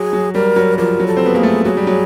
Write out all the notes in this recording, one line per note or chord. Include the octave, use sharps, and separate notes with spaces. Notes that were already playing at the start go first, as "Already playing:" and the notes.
Already playing: F#3 G#4
F#3
G3 A#4
F#3
F3 A#4
F#3
A4
C4
B3
A#3 G#4
A3
F#3 G#4
G3
F#3